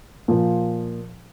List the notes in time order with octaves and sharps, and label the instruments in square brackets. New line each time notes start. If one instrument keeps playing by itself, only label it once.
[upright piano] A#2 F3